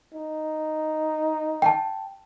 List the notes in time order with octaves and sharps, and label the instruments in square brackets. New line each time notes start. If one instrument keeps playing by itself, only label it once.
[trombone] D#4
[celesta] G5 A5